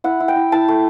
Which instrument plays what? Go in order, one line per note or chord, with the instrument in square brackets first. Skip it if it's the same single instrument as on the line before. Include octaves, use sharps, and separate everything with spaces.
[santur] E4 F#5
E4
G5
E4
E4 A5
A3